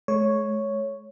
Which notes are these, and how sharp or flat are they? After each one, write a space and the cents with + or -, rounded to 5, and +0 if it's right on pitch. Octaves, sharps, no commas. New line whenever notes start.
G#3 +45 C#5 +0